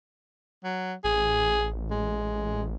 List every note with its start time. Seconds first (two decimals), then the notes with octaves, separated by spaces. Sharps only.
0.64 F#3
1.04 A1 G#4
1.91 G#3